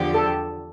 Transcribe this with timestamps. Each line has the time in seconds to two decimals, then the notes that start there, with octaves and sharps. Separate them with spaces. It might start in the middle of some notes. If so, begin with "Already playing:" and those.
Already playing: E2 D3 F3 G4
0.14 A4